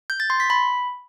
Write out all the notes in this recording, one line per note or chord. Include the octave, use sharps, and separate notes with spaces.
G6
A6
C6
B6
B5